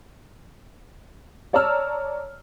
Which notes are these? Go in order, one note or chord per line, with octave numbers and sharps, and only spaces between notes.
C#5 D5 A5 A#5 E6 F6